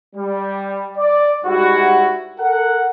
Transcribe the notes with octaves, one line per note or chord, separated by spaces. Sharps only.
G3
D5
G#2 G3 E4 F#4
A4 A#4 F#5